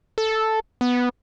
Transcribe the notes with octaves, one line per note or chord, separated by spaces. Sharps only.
A4
B3